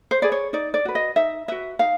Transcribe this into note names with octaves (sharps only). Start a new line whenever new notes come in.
C5
G#4 B4 D5
C#5
D#4 D5
D5
F#4 B4
D#5
D#4 E5
F#4 B4 E5
D#4 F5